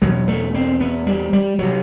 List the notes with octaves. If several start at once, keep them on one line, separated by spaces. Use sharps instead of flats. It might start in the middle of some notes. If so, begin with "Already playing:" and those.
E2 B2 F#3
A3
C4
B3
G3
G3
C3 F#3